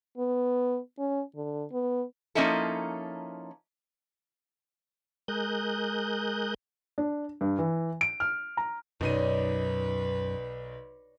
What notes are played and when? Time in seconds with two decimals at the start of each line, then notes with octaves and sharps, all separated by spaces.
0.18 B3
0.99 C#4
1.35 D3
1.72 B3
2.35 F3 A#3 C#4 D#4 E4 A4
5.28 G#3 A#4 D#6 F#6 G6
6.98 D4
7.41 G2
7.59 E3
8.01 D7
8.20 F6
8.57 A#5
9.01 B1 F#2 D#4 B4 C#5 D5 D#7